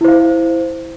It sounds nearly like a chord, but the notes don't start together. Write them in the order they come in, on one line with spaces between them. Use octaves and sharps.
E4 C5 F5